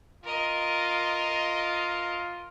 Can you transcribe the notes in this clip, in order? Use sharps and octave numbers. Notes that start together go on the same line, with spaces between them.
F4 A#4 D#5